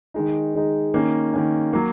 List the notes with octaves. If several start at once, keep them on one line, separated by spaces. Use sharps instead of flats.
D#3 G#3 D#4
D#3 G#3 D#4
D#3 A#3 C#4
D#3 A#3 C#4
F#3 A#3